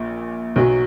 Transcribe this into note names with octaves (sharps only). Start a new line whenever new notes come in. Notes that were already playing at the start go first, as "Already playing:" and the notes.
Already playing: A#1 A#2
B1 B2 F#3